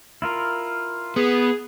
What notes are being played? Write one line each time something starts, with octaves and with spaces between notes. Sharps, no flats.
E4 F4 A#4
B3 G#4